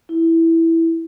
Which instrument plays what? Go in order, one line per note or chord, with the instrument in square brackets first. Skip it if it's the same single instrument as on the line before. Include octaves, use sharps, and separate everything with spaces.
[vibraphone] E4